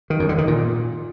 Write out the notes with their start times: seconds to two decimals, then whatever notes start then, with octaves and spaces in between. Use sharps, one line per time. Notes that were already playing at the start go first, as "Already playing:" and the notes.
0.10 D#3
0.20 F#2
0.29 D3
0.38 D#3
0.47 A#2